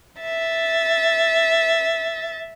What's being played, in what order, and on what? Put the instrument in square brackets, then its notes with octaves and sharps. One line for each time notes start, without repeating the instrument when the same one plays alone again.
[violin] E5 A6